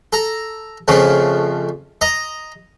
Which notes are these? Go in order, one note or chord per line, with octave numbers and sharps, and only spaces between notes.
A4 A#5
F2 C#3 F3 A3
D#5 A#5